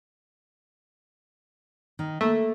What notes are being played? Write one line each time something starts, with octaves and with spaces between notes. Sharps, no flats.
D#3
A3 A#3